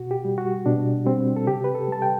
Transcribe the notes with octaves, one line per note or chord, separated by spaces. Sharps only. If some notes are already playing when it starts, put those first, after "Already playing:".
Already playing: B2 F#4
G4
G3
F#4
B2 D4
G3 C4
A4
C3 G4
B4
A4
G3 A5
G5